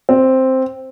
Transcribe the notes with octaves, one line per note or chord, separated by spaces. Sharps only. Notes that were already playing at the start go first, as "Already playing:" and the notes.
C4